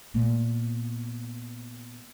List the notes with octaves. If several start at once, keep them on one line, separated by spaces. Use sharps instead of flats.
A#2 B3